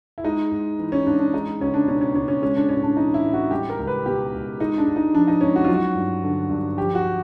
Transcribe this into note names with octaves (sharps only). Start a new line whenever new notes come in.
E4
G#3 D#4
G#2
E3
C#4
G#2 D4
D4
G#3 D#4
C#2 C#4
D4
B2 C#4
C#4
C#2 C#4
C#4
G#3 C#4
D4
A2 C#4
D4
E3 D#4
E4
A2
F#4
G3 G4
A#4
C#2
B4
B2 G4
C#2
G#3 D#4
D4
G#2
D#4
F3 D4
D#4
G#2 C#4
F#4
F#3 F4
F#4
G2
D3
G2
F3 G4
F#4